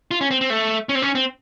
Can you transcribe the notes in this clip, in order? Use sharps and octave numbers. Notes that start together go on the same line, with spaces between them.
F4
C#4
C4
C4
A3
C#4
C4
C#4
C4